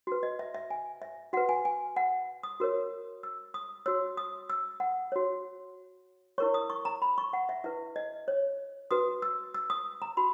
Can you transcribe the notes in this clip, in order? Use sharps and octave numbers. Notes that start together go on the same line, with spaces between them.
F#4 B4
D#5
E5
E5
G#5
E5
F#4 B4 F#5
G#5
G#5
F#5
D#6
F#4 A#4 C#5
E6
D#6
F#4 C#5 E6
D#6
E6
F#5
F#4 C#5
E4 A#4 C#5 C#6
D#6
C#6
A#5
B5
C#6
F#5
E5
E4 B4 E5
D#5
C#5
F#4 B4 D#6
E6
E6
D#6
A#5
F#4 B5